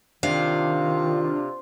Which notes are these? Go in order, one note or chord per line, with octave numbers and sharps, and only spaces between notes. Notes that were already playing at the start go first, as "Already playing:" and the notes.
C3 D#3 D4 F4 F5